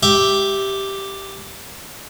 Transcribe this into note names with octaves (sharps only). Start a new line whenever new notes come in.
G4 E5